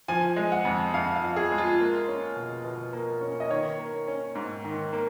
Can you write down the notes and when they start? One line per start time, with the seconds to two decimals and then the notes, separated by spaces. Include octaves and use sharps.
0.08 F3 G#5
0.36 G#3
0.52 F#5
0.65 F2
0.94 F2 F5
1.15 F5
1.22 F3
1.36 G#4
1.51 G#3
1.58 F4
1.79 A#3
2.08 C#4
2.36 B2
2.65 B2
2.93 A#3
3.21 C#4
3.40 D#5
3.49 D#3 C#5
3.79 A#3
4.08 C#4
4.35 G#2
4.64 D#3
4.93 A#3